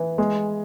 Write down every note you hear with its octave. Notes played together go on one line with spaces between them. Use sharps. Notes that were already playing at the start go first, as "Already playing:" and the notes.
Already playing: E3
G#3